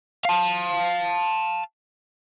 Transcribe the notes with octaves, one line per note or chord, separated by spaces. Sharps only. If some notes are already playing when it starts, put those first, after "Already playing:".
F5 A5